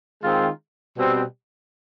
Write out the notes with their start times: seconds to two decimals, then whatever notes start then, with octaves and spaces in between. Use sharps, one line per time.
0.23 D#3 G#3 C4 F4
0.96 B2 G3 C4